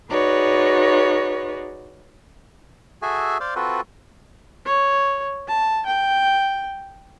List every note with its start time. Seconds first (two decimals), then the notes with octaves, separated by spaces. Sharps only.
0.10 D#4 F#4 G#4 B4 C#5 D5
3.02 F#4 G#4 A4 E5 G#5
3.40 C5 D5 F5
3.56 C4 F4 F#4 A4 B4
4.66 C#5
5.48 A5
5.86 G5